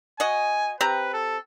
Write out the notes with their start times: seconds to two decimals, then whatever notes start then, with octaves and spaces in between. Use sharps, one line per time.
0.20 F#4 D#5 G#5
0.81 C4 G4 B4 A#5
1.13 A4